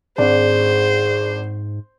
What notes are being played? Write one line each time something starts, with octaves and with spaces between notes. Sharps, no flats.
G#1 G#2 D4 G#4 C5